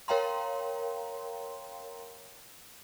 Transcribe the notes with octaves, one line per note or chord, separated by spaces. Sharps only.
A#4 C#5 F5 G5 A#5 C6